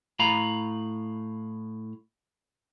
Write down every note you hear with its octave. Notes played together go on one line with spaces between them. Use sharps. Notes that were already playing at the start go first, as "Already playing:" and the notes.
A2 F5 A#5 B5